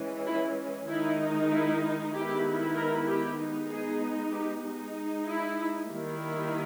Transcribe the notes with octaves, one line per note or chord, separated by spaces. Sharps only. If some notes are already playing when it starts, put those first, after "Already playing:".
Already playing: E3 G#3 C#4
E4
D#3 G#3 D#4 E4
E4
D#3 G#3 B3 E4 G4
A#4
G4
G#3 B3 D#4
G#4
G4
G#3 D#4
E4
D#3 G3 A#3 E4